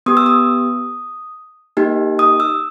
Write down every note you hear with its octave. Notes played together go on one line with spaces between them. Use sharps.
B3 G4 D#6
E6
D#6
A#3 D#4 G4
D#6
E6